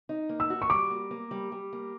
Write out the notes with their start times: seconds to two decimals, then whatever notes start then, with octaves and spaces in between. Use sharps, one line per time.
0.09 D#4
0.29 A#3
0.40 E6
0.50 F#4
0.62 C#6
0.70 G3 D6
0.90 A#3
1.11 A#3
1.31 G3
1.52 G3
1.73 A#3